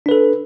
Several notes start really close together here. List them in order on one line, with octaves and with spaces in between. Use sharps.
D4 B4 A4